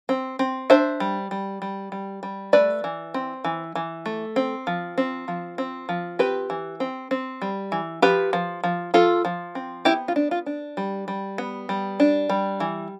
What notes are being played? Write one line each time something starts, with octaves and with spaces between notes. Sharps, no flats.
C4
C4
D4 C5 E5
G3
G3
G3
G3
G3
A3 B4 D5
E3
C4
E3
E3
A3
C4
F3
C4
F3
C4
F3
C4 G4 B4
E3
C4
C4
G3
E3
F3 G4 B4
F3
F3
F3 F4 A4
F3
C4
B3 E4 G4
F4
D4
F4
D4
G3
G3
B3
G3
D4
G3
E3